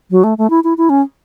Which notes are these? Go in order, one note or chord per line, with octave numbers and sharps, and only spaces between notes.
F#3
A3
A3
E4
E4
E4
C#4